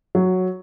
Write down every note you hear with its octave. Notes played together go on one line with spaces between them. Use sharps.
F#3